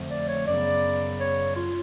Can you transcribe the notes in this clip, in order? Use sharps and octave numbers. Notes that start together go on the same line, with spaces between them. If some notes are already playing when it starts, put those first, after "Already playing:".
Already playing: F2 D3 F3 A3
D5
C#5
F#2 C#3 F#3 B3 D5
C#5
F4